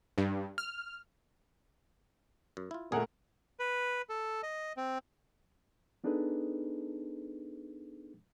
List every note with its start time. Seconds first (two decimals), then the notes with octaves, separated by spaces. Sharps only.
0.18 G2
0.58 F6
2.57 F#2
2.71 E4 F4
2.92 A#2 A3 A#3 G#4 A#4 F#5
3.60 B4
4.09 A4
4.43 D#5
4.77 C4
6.04 B3 D4 D#4 G#4 A4 B4